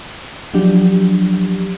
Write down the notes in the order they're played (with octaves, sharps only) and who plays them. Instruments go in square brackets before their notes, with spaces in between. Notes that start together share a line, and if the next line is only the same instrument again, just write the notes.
[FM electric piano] F3 F#3 D4 G4